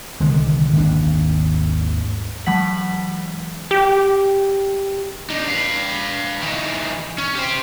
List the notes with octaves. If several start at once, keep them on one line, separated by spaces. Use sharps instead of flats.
C2 D3 D#3 G#3
G#1 D#2 D4
E3 F#3 G#3 F#5 B6 F#7
G4
D4 D#4
B4 F5
E3 D#4
C#4
G4 C5